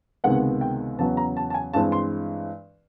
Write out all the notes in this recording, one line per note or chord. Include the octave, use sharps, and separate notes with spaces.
C#2 C3 D#3 G#3 B3 F#5
G5
E2 C#3 F#3 B3 A5
A#5
A5
A5
G#5
G2 E3 G#3 C4 A5
C6